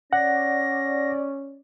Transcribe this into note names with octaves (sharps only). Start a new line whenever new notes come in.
C#4 D5 F#5 A#6